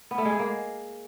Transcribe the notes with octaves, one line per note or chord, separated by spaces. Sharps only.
B3
A3
G#3
G#4
A#3